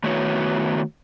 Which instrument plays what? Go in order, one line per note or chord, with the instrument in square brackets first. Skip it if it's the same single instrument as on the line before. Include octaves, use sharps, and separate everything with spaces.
[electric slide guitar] D#3 A3 B3 E4 F#4 C#5